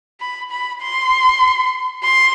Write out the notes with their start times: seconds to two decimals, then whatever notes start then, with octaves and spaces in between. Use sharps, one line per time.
0.20 B5
0.51 B5
0.81 C6
2.03 C6